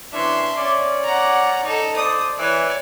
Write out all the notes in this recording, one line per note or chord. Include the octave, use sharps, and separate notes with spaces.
E3 C#4 D4 E5 C6
C#4 D5
F#5 A#5
D#4 A4
A4 C5 D5 D#6
E3 C#5 D5